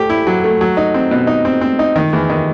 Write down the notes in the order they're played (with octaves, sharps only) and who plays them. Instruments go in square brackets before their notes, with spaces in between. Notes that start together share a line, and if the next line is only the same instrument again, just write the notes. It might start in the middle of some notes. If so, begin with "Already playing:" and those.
Already playing: [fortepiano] A3 G4
E4
F#3
A3
F#3
D#4
C4
B2
D#4
C4
C4
D#4
D#3
E2
D#3